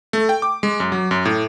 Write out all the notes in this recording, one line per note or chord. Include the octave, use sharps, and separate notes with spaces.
A3
G5
D6
G#3
F#2
F#3
F#2
A2